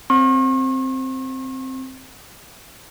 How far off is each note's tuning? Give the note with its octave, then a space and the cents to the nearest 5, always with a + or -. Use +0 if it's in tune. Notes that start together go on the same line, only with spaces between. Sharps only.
C4 +0 C#6 -45